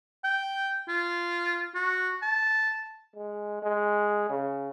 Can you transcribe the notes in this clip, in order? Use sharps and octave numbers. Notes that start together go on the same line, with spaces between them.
G5
F4
F#4
A5
G#3
G#3
C#3